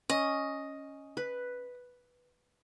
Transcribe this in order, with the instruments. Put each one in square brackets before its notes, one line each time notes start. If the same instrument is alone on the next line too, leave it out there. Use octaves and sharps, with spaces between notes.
[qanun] C#4 [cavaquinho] D#5
[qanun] B4